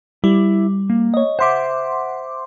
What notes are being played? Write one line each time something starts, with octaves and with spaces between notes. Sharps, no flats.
G3 E4
A#3
C#5 D#5
C5 E5 F#5 C6 D6